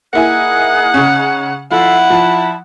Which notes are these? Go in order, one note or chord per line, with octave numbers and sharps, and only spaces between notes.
A#3 D#4 E4 G#4 F#5 G#5 F#6
C#3 C#4
F3 E4 F4 A4 E5 F#5
F3 A5 B5